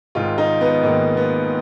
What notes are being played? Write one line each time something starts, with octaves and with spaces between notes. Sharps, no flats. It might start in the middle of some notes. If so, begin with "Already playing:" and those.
G#1 G#2 D#3 F4
D#4
B3
G#1 G#2 D#3 A#3
B3